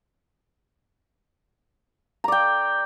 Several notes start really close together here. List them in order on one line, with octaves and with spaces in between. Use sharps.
A#5 D5 G5